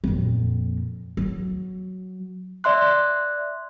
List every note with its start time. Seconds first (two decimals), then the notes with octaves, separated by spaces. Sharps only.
0.04 F2 A#2
1.17 F#3
2.64 D5 E5 C6 F#6